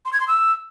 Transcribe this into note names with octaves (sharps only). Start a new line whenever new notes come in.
C6
G#6
C6
E6